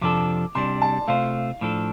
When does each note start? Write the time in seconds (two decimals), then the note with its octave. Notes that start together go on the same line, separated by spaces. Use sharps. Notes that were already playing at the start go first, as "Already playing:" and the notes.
0.01 F2 C3 F3 D4 A4 D6
0.55 C3 G3 D4 C6
0.82 A5
1.08 C3 A3 F4 C5 F5
1.61 A2 F3 D4 A4